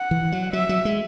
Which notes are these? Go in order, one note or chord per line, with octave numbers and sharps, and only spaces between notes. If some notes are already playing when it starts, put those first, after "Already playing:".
Already playing: F#5
E3
F#3
F#3 E5
F#3
G#3